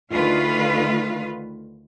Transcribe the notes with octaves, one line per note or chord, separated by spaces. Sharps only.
D2 D#3 A3 F4 B4 F5